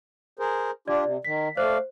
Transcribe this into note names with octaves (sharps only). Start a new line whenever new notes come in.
G#4 A#4 C5
D4 F4 G4 D5
C3
D#3 B6
A3 C5 D5 F5